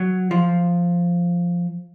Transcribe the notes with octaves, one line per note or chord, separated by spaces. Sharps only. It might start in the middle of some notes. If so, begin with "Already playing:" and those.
Already playing: F#3
F3